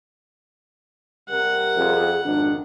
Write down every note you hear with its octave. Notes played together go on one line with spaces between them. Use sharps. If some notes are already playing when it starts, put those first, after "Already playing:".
C3 G3 A#4 F#5
F2 G#4
G#1 F2 D#3 D4